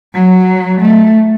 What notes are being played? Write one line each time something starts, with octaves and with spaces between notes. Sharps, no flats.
F#3
A3